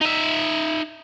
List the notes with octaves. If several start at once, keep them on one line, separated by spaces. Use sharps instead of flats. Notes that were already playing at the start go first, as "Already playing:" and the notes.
D#4 E5